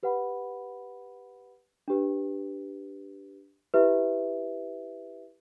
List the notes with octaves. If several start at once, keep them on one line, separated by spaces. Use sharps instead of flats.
G4 B4 F#5 B5
D4 G4 B4
E4 G4 B4 E5